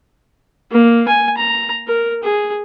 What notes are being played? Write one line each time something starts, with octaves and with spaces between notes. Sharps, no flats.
A#3
G#5
A#5
A#4
G#4